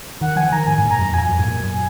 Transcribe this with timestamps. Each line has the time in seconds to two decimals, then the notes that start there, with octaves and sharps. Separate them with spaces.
0.21 D#3 F#5
0.36 F3 G#5
0.52 D#3 A#5
0.67 G#2 G#5
0.78 G#2
0.82 A#2
0.91 A#5
0.98 F#2
1.13 F2 G#5
1.29 F#2
1.39 G#2
1.44 A#2
1.60 F#2